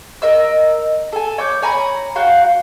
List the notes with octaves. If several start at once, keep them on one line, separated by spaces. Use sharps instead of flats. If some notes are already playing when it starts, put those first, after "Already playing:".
A#4 D#5 E6
A4 G#5
C#5 D6 G6
C#5 G#5 A#5 B5
F#4 F5 G5